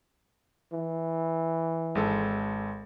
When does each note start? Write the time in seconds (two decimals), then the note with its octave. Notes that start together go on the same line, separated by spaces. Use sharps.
0.72 E3
1.95 G#1 G#3 A4